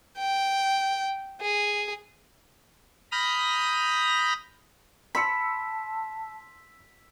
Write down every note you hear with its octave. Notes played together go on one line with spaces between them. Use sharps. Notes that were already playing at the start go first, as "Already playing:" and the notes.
G5
G#4
A#5 B5 D#6 F6 G6 A#6
A5 B5 C6 E6 B6 C#7